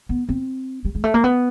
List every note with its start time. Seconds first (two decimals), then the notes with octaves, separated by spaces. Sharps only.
0.09 B3
0.29 C4
0.85 G3
0.95 G#3
1.04 A3
1.14 A#3
1.24 B3